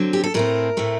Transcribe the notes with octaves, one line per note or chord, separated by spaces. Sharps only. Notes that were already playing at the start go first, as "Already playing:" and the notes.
Already playing: D3 F#3 C4
G4
A4
A2 A3 C4 A#4
A2 A3 C4